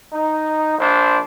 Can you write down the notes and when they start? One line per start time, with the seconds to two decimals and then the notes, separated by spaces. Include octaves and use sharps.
0.13 D#4
0.79 A#1 D4 C5